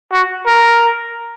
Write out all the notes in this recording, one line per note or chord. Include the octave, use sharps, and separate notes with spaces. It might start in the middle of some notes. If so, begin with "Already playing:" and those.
F#4
A#4